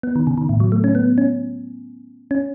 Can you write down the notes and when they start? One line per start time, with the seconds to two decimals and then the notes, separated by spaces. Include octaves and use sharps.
0.03 B3
0.16 D#3
0.27 C#3
0.38 D#3
0.49 A2
0.60 F#3
0.72 A3
0.84 C#4
0.95 B3
1.18 C#4
2.31 C#4